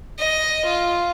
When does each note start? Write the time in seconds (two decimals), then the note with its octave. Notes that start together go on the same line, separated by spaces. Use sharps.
0.19 D#5
0.67 F4